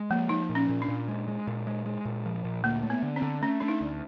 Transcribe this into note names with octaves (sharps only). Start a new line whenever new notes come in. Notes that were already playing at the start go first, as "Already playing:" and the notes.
Already playing: G#3
F3 A#3
F3 D#4
A#2
C#4
A#2
D4
A#2
G#3
G#3
A#2
G#3
G#3
A#2
F3
A#2
D2 A#3
A3
B3
D3
C4
D3
A3 C#4
A3 D4
D#4
D2